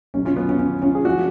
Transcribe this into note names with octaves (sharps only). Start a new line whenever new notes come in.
B1 B2 F#3 C#4
C#4 F4
B3
C#4
C#4
C#4 F4
G#4
F3 G#3 D4 F#4